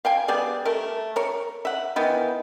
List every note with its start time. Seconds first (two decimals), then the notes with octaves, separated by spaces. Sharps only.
0.05 F5 G5 G#5
0.28 G3 B3 G#4 D5
0.65 A3 A#4
1.16 A#4 C#5
1.65 E5 F#5
1.96 D#3 E3 B3